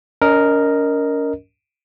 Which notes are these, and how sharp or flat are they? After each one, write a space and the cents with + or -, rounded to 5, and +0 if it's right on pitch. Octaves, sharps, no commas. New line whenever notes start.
C#4 +40 A#4 +0 D#5 +0